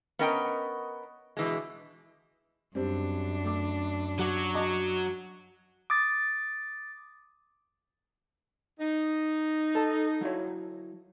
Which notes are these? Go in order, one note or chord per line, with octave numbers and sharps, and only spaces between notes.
B3 C#4 A#4 D#5 G5
B2 E3 G#3
F#2 G3 C4 D4
A3 D6
F#3 F#4 D6
D#5 A5 D6
D6 D#6 A6
D#4
A4 A5
F#3 E4 C#5